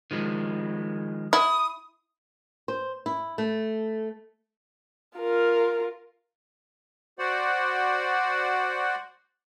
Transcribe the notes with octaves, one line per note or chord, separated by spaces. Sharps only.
D#3 F3 G#3
E4 D#6
C5
E4
A3
F4 A#4
F#4 C5 D5 F#5